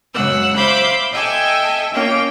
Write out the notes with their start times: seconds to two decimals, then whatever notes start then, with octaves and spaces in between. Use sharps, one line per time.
0.13 F#2 C#3 G#3 F#5 E6
0.56 C5 E5 F5 B5 D6 G6
1.11 A4 D#5 E5 G5 G#5
1.94 A#3 C#4 F4 G5